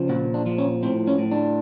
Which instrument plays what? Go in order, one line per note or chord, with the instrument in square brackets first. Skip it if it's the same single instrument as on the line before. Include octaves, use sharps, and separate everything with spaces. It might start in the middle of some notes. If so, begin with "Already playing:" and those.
Already playing: [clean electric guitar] C#3 F3
A#2 F#4
D4
F3
C#4
A2 C4
C#4
A2
D4